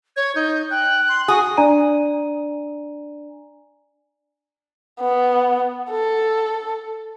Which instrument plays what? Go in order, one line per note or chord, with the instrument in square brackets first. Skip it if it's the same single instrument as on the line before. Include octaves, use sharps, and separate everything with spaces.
[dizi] C#5 [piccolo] G#6
[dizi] D#4 [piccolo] G6
[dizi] G5 [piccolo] F#6
[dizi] C6
[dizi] F#4 [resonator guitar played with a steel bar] G#4 [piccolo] D#6
[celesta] D4 D5 G#5 A#5 D#7
[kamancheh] B3
A4